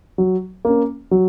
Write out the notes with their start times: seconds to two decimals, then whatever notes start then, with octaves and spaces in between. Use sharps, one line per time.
0.18 F#3
0.65 A#3 C#4
1.11 F#3